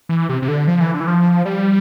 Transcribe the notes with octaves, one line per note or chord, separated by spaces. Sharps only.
E3
C3
C3
D3
F3
E3
D3
E3
F3
G3